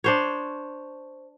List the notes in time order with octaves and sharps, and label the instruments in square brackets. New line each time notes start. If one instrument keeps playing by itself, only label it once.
[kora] D4 C5 C#5